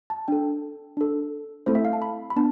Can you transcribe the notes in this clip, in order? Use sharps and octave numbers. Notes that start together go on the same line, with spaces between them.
A5
D4 A4 G5
D4 A4
A3 C4 E4 A4 C5
E5
F5
A5
B5
B5
B3 D4 A5